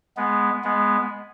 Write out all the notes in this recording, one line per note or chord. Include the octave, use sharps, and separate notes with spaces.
G#3 B3
G#3 B3